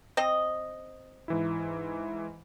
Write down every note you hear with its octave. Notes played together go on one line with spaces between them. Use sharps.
C4 D#5
G#2 E3 E4